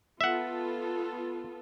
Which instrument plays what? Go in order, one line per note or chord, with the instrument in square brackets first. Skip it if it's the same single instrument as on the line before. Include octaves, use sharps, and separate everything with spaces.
[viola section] B3 F4 A4 [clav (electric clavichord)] E5 F#5